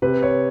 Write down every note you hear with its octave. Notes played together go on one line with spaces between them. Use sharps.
C3 B4
C#5